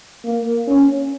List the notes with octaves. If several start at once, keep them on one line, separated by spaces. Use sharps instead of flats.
A#3
C#4